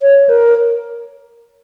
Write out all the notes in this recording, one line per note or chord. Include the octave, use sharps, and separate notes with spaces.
C#5
A#4